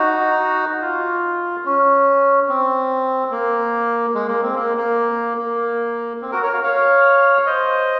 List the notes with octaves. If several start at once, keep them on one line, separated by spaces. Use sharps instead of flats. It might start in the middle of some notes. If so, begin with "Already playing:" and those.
Already playing: D#4 F#4
F4
C#4
C4
A#3
G#3
A#3
C4
A#3
A#3
A#3
C4
F#4 A#4
A#4 C#5
C#5 F5
C#5 F5
C5 D#5